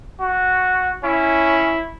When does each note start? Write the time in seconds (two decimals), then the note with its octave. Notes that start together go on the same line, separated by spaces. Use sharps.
0.21 F#4
1.04 C#4 E4